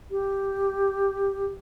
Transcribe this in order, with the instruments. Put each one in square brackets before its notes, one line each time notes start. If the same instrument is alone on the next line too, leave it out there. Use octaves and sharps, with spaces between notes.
[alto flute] G4